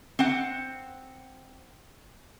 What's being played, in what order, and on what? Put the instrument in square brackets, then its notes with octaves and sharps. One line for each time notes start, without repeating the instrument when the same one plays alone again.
[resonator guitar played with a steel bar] C4 F#5